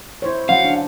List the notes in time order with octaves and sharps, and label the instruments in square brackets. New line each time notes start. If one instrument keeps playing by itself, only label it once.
[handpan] E4 C5 C#5
[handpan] F#3 C#4 [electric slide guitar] F5 [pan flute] F#5
[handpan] D4